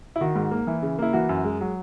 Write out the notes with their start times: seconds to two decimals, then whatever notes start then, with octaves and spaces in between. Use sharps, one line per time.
0.16 E4
0.21 D#3 F#4
0.35 G#2
0.51 A#3
0.67 E3
0.82 C#3
0.99 A#3 E4
1.13 E3 F#4
1.29 F#2
1.45 G#3
1.61 F#3